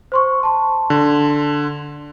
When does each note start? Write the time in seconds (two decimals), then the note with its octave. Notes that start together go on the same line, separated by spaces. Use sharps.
0.12 C5 C6 C#6
0.43 A5 C6
0.90 D3